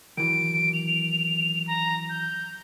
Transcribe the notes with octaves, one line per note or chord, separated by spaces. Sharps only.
D#3 E3 F#3 D7
F7
A#5
G6